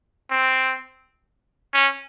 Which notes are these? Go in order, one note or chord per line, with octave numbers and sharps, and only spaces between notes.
C4
C#4